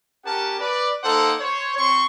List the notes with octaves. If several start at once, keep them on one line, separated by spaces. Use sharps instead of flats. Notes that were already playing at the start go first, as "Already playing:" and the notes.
C#4 G4 A#4 F#5 A5
B4 D5
A#3 D#4 A4 C5 F#5
C5 C#5
C4 C6 C#6